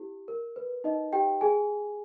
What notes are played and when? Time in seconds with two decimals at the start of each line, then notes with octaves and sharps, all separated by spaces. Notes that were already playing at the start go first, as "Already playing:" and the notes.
Already playing: E4 G4
0.28 A#4
0.56 B4
0.84 D#4 D#5
1.13 G4 G5
1.41 G#4 G#5